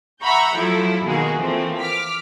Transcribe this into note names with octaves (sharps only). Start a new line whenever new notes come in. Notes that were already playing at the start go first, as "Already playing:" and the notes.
E5 F#5 A#5 B5 C#6 G6
F3 F#3 A3 E4 A4
B2 D#3 G#3 A#3 F#4 G#4
E3 F3 A3 A#3 C4
D6 F6 B6